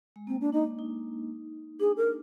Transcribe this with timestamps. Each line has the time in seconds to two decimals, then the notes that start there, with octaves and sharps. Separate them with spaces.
0.16 G#3
0.27 A#3 C4
0.41 D4
0.52 D4 D#4
0.79 D#4
1.80 D4 G#4
1.97 A#4